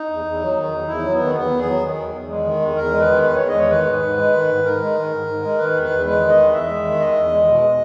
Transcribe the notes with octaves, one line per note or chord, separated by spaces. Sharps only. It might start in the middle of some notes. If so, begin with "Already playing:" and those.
Already playing: D#4
E2
E2
F#3
D#3
E2
E2 E4
F#3
B3
D#3
E2 B3
E2
G#4
F#3
D#3
E2
E2
G#3
D#3
E2
E2 A#4
G#3
B4
D#3
E2 B4
E2 C#5
D#5
G#3 C#5
D#3 B4
G#2
G#2
G#3
D#3
G#2
G#2 A#4
G#3
D#3
G#2
G#2
G#3
D#3 B4
E2
B4
E2
G#3 B4
D#3
D#5
E2
E2 E5
G#3
D#3
E2 D#5
E2
G#3
B2